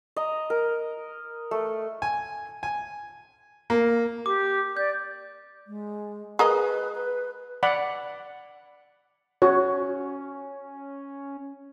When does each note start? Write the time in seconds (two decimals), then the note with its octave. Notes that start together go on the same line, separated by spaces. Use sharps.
0.16 D#5 A#5
0.50 A#4
1.51 A3
2.02 G#5
2.63 G#5
3.70 A#3
4.26 G4 D6
4.77 D5 G6
5.67 G#3
6.39 G#4 A#4 B4 D#5
6.96 B4
7.63 D5 F#5 B5
9.42 C#4 F#4 C#5